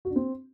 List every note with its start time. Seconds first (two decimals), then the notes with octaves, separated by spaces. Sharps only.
0.05 F#4
0.10 D4
0.16 C4